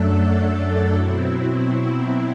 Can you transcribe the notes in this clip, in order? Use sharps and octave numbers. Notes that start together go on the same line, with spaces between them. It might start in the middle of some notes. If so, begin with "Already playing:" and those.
Already playing: F#2 F#3 A3 D4 A4
B2 F#3 C4 E4